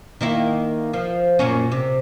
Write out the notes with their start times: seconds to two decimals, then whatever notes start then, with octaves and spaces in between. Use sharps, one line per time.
0.21 D#3 A#3 E4
0.93 F3
1.39 F#2 A#2 C#4
1.72 C3